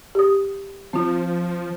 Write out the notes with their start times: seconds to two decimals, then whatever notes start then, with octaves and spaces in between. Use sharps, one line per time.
0.15 G4 D#6
0.93 F3 C4 F4